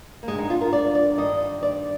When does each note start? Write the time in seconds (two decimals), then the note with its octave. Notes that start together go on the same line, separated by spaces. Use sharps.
0.23 A#3
0.27 G2 D3 G#3
0.38 D#4
0.50 F4
0.61 A#4
0.73 D5
0.95 D5
1.17 G2 D#3 D#5
1.63 D5